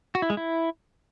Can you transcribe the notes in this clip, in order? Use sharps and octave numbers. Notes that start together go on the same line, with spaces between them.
F#4
E4
G#3
E4